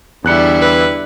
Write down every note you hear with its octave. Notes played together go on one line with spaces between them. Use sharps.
E2 D3 G3 E4 F#6 C#7
B4